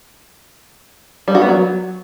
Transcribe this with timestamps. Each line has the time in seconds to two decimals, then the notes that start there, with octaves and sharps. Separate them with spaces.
1.28 G3
1.35 F#4
1.42 B3
1.49 F#3